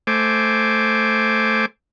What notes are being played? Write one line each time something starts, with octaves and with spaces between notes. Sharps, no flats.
A3 C5 G#5 D6